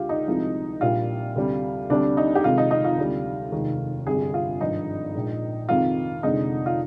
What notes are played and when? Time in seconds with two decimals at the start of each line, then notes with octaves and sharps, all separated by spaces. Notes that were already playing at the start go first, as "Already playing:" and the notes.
Already playing: D2 D3 G#3 F4 G4
0.09 D#4
0.27 C2 C3 F3 G#3
0.81 A#1 A#2 G3 F4
1.36 D2 C3 G3
1.90 D2 C3 G3 D4
2.17 D#4
2.35 G4
2.44 F1 F2 C3 D#3 G#3 F4
2.58 D#4
2.71 D#4
2.85 F4
2.98 D2 C3 G3
3.52 F1 D#2 D#3 G#3
4.07 G1 F2 C3 G3 G#4
4.34 F4
4.61 G#1 G2 F3 D#4
5.14 A#1 A#2 G#3
5.69 F2 C3 D#3 G#3 F4
6.23 F1 F2 D3 G#3 D#4
6.66 F4